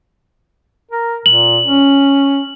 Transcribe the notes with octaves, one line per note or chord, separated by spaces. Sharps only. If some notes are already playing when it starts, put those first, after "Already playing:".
A#4
A#2 F#7
C#4